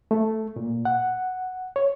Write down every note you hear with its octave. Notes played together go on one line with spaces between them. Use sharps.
A3
A#2
F#5
C#5